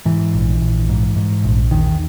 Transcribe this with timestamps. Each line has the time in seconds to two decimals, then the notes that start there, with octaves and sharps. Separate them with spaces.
0.06 G#2 E3
0.34 A#1
0.61 A#1
0.89 G#2
1.16 G#2
1.44 A#1
1.71 E2 D#3